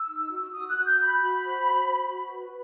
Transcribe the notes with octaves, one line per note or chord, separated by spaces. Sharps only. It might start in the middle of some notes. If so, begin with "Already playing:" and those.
Already playing: E6
D#4
F#4
F#4 D#6
F#6
F#4
G6
F#4 B5
F#4
C5
F#4
F#4
F#4
B4